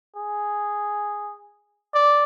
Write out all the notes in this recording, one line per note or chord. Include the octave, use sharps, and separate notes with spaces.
G#4
D5